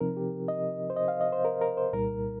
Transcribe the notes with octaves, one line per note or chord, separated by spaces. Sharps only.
C3 F3 C4 D#4 A#4
G4
D#5
C5
D#5
F5
D#5
C5
A#4
A#4
C5
C2 A#2 G3 D#4 A#4